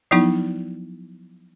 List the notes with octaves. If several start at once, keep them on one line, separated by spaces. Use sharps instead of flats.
F3 F#3 B3 D#4 E4